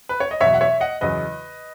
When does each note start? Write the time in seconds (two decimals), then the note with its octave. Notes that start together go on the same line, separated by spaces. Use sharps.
0.09 B4
0.20 C#5
0.31 D#5
0.41 E2 B2 F#3 C#5 E5
0.54 F#5
0.61 C#5 E5
0.80 D#5 F#5
1.01 E2 C#3 F#3 B4 D#5